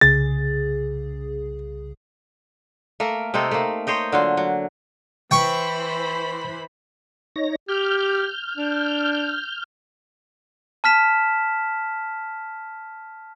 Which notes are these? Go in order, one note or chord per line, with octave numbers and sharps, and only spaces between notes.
C2 C#3 G#4 A6
A3 A#3 A#4
C3 C4 D#4 A4
A3 A#3
C5 C#5 D#5 G5
D3 F#3 F4
F#3
E3 C5 G5 B5 C#6
D#4 C#5 A#6
G4 F6 G6
D4
A5 F6 B6 E7